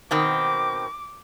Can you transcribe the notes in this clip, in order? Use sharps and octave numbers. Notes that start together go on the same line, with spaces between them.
B2 D#3 C4 D6